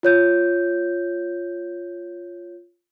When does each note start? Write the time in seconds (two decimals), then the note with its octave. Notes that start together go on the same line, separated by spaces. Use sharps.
0.03 F4 C#5 G6